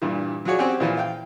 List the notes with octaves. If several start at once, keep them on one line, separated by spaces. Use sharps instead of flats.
G2 A#2 E3
F#3 F4 F#4 G#4 C#5 D5
C4 C#4 G4 F#5 G#5
A#2 E3 F3
F5 G5